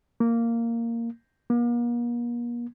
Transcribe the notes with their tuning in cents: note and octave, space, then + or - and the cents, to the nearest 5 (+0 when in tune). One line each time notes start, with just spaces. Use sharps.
A#3 -10
A#3 +40